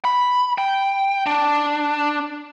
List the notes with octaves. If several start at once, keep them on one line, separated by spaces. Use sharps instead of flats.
B5
G5
D4